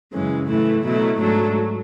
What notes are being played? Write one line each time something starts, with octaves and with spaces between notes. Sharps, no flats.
F#2 C#3 E3 G#3 C#4
A2 E3 A3 E4
B2 F#3 A3 E4
G#2 F#3 A3 D4